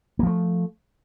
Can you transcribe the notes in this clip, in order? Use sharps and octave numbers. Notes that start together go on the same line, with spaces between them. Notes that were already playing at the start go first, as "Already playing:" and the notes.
F3 A3 A#3